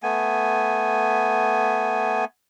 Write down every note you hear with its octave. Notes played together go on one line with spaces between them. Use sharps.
A3 B3 G#5